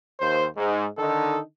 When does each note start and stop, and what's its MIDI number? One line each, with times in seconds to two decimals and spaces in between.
0.21 0.46 39
0.21 0.46 72
0.57 0.87 44
0.98 1.40 50
0.98 1.40 51
0.98 1.40 63
0.98 1.40 69